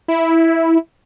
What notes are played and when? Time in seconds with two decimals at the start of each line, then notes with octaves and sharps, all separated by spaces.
0.08 E4